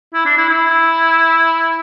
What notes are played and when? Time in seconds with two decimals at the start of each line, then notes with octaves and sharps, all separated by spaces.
0.14 E4
0.26 D4
0.38 E4
0.49 E4